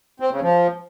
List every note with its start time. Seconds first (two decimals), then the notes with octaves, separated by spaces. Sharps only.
0.20 C4
0.31 C#3
0.42 F3